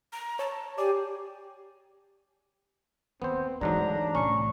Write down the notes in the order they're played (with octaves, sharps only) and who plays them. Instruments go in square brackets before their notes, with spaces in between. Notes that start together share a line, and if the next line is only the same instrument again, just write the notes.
[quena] A#5
[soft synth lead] C#5 [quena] A5
[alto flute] G4 [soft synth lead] D5 [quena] G#5
[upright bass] D#2 [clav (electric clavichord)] B3 C5 [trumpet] C4
[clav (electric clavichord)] D2 G#2 F#3 [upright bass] E3 [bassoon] D4 [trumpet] A#5
[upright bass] C2 A2 [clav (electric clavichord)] C#4 [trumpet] C#6